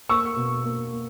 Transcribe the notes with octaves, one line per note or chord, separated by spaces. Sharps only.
A#3 C#6 E6
B2
A#3
A#3